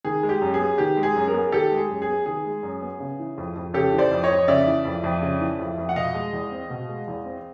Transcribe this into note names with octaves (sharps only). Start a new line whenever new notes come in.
D#3 G#4
G#3
G4
F#2
G#4
B3
D#3 G4
G#3
G#4
F#2
G#4 A#4
B3
D#3 G4 A4
G#3
G#4
F#2
G#4
B3
D#3 G#4
G#3
F#2
B3
C#3
E3
F2
F2
C#3 G4 A4
E3
C5 D5
F2
C#5 D#5
F2
C#3 D5 E5
E3
F2
F2
C#3
E3
F2
F2
F#5
B2 D#5 F5
G#3
E2
C4
B2
G#3
E2
C4